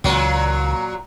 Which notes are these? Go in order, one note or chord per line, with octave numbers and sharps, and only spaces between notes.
C#2 A#2 E3 F#3